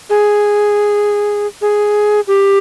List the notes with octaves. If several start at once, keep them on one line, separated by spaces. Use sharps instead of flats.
G#4
G#4
G4